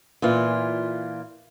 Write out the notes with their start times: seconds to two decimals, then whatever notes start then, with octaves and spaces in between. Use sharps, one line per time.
0.22 A#2 E3 F4